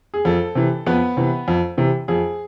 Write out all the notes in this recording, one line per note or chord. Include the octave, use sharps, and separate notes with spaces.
G#4
F2 A4
C3 E3
F2 B3 B4
C3 E3
F2
C3 E3
F2 G#4